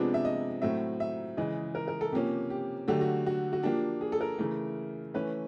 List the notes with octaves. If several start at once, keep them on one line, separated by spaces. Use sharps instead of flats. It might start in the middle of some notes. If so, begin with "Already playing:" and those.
Already playing: C3 F3 G#3 B3 D4
E5
D#5
A2 F#3 A3 C4 E5
E5
C#3 E3 G#3 D#5
A#4
A#4
A4
C3 F3 A#3 C#4 G4
G4
D3 F#3 A3 G4
F#4
F#4
F#4
F3 A#3 D4 G4
G#4
A4
A#4
C#3 E3 A3
E3 A3 C#4 B4